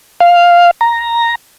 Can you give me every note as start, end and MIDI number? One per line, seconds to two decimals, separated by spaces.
0.20 0.71 77
0.81 1.35 82